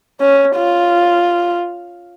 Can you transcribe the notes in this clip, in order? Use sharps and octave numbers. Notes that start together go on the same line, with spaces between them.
C#4
F4